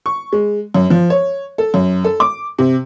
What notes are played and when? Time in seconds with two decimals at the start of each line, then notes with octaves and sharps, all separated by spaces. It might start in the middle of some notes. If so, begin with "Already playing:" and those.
0.06 C#6
0.33 G#3
0.74 F#2
0.90 F3
1.10 C#5
1.58 A4
1.74 F#2
2.04 A4
2.20 D6
2.59 C3